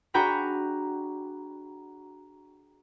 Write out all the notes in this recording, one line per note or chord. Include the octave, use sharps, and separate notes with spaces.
D4 F#4 G#4 G5 A#5 B5